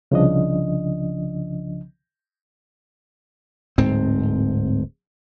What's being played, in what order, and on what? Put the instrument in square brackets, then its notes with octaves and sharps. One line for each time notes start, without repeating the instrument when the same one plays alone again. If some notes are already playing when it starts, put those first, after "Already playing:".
[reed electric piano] C2 C#3 F3 D4 D#5
[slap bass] D1 G#2 C4